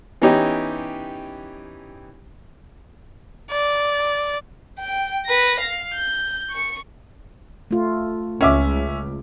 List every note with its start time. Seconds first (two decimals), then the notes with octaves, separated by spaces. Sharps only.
0.22 E3 B3 C#4 D#4 G4
3.51 D5
4.79 G5
5.25 B4 A#6
5.60 F5
5.94 G6
6.51 C#6 C#7
7.71 A3 F4
8.41 C#2 C#4 E5 D6